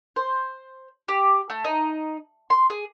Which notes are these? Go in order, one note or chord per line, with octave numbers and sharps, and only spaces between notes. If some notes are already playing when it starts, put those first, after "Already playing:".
C5
G4
A3
D#4
C6
G#4